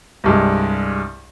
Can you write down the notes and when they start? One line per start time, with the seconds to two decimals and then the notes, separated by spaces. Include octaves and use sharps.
0.24 C2 G2 G#3